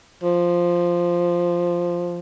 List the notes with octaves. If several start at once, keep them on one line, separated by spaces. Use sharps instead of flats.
F3